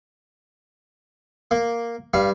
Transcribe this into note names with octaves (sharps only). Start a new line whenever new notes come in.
A#3
G2 G3 F5